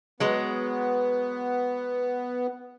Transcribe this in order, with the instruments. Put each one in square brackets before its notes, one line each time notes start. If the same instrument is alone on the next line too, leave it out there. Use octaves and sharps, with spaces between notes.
[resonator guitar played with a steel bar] F#3 G#3 [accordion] B3